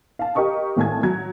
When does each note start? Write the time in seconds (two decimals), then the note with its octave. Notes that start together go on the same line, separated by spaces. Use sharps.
0.19 F5 A5
0.35 G4 A#4 D#5 C#6 D#6
0.77 G#1 A2 G#5 A5 G#6
1.03 F#3 G#6